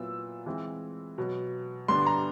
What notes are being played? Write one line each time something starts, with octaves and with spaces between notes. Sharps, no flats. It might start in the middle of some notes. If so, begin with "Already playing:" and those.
Already playing: A#2 F#3 B3 E4 E6
E3 G#3 C4
B2 F#3 B3
G2 D3 G3 B3 D4 C6
A#5